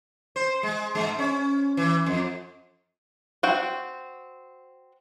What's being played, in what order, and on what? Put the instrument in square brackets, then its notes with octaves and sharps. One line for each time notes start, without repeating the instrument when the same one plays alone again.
[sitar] C5
G#3
G#2 G#3
C#4
E3
F2
[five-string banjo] C4 F#4 G5